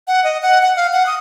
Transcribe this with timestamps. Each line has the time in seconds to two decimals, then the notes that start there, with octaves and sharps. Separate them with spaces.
0.08 F#5
0.24 D#5
0.42 F#5
0.62 F#5
0.76 F5
0.93 F#5
1.06 D#6